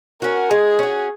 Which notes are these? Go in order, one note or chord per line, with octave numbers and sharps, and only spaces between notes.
C#4 F#4 A#4
G#3 G#4
C#4 F#4